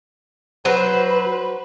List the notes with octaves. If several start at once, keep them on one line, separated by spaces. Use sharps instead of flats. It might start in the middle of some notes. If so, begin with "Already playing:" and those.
F#3 B4 C5